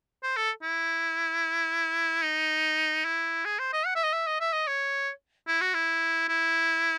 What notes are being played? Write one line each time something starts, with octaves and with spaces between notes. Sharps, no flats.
C5
A4
E4
D#4
E4
G#4
C5
D#5
F#5
E5
D#5
E5
D#5
E5
D#5
C#5
E4
F#4
E4
E4